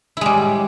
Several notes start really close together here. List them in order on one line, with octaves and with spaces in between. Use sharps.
E4 G#3 G3